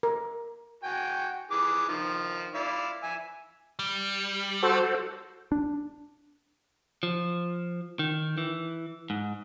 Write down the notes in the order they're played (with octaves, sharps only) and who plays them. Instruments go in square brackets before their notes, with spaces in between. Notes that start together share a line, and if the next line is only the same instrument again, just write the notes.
[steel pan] A#4
[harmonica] F#4 G5 G#5
E3 G#4 D6
D#3 F3
E4 F4 D5
E5 G#5
[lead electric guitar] G3
[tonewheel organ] F#4 A4 C5
[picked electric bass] D4
[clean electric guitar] F3
D#3
E3
G#2